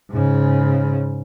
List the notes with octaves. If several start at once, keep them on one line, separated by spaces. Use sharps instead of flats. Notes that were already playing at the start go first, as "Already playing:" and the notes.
G#2 C#3